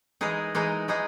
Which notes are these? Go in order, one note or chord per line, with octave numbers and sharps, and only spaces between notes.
E3 G#3 D#4 G#4
E3 G#3 D#4 G#4
E3 G#3 D#4 G#4